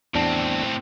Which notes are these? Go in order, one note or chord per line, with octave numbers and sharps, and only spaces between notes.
E2 A2 C4 D4 A5